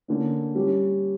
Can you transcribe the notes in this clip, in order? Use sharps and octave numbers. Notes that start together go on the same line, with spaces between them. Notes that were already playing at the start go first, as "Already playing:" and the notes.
D3 A#3 C#4
G3 C#4 G4